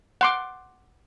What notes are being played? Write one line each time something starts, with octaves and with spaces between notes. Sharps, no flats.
F#5 C6 D6